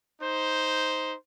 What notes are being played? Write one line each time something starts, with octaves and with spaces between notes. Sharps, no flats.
D#4 C5